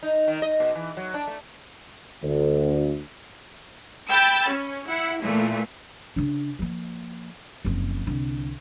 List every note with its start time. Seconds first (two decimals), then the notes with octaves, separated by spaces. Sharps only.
0.03 D#4
0.28 D#3
0.42 D#5
0.60 B2
0.75 E3
0.97 F#3
1.14 D4
1.27 A3
2.23 D2
4.10 G5 B5 E6 A6
4.49 C#4
4.89 E4 F#5
5.22 A#2 E3 A3
6.16 C#3 D4
6.59 F3 A#3
7.65 F#1 F2
8.07 C2 D3